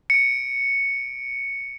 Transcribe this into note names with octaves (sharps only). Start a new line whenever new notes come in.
C#7 D7